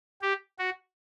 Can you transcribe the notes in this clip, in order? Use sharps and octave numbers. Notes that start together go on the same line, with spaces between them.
G4
F#4